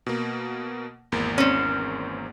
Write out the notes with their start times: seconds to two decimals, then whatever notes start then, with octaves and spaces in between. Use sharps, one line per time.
0.06 B2 A#3
1.12 G#1 E2 A#3
1.38 C4 C#4